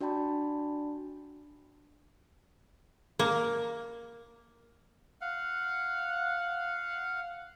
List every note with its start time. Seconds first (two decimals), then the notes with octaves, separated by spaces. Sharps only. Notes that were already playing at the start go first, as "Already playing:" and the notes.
0.01 D4 F#4 D5 G5 A5 B5
3.19 A#3
5.21 F5 F#5